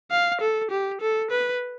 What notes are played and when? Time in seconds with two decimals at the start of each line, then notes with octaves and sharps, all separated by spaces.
0.11 F5
0.41 A4
0.71 G4
1.01 A4
1.31 B4